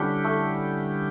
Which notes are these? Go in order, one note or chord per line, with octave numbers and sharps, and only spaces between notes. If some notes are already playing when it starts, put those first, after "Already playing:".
Already playing: D3 G3 C#4 D4 E4 G4
A3